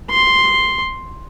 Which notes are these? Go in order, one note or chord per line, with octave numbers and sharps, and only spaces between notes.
C6